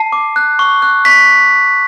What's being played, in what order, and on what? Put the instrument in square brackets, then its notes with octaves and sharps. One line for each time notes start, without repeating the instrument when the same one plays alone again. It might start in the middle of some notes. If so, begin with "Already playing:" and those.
Already playing: [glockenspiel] A5 C7
D6
F#6
C#6
F#6
C#6 B6